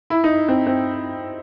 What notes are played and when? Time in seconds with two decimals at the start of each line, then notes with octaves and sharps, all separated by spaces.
0.10 E4
0.24 D#4
0.48 C4
0.67 C4